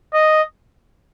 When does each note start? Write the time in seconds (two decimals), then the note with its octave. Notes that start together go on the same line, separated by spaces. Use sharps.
0.14 D#5